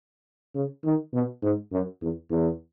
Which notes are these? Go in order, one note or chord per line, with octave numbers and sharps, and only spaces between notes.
C#3
D#3
B2
G#2
F#2
E2
E2